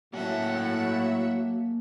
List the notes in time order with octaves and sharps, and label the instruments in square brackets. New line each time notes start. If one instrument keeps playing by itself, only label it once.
[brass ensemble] A2 [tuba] F#3 [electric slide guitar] A#3 G#5 A5 [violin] E5 F#5